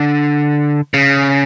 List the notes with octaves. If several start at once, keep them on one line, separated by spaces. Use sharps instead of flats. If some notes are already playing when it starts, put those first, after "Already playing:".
Already playing: D3
C#3